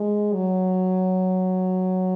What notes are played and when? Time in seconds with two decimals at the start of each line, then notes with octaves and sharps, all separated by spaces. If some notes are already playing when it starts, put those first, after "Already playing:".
Already playing: G#3
0.33 F#3